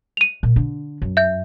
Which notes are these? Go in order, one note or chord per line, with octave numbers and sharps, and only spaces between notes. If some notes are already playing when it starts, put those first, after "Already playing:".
D#7 F7
A#2
D3
F#2
E5 G6